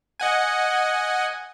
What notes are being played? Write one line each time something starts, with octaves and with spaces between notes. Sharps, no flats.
D#5 F#5 G#5